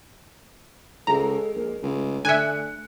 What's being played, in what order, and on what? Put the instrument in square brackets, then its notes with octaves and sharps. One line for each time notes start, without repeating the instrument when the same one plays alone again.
[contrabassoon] C#2 [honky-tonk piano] G#3 [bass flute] A4 [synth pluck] A#5
[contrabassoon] A#1 [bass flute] A#4
[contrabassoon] C#2 [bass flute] A3
[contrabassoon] D3 [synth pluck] E5 G#5 [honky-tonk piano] F#6 C#7